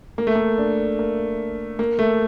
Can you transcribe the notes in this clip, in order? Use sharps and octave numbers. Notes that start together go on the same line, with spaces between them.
A#3
A3
A#3
D4
A#3
A#3
A3